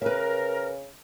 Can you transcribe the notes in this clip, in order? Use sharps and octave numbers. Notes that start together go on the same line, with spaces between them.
C#3 A#4 B4 E5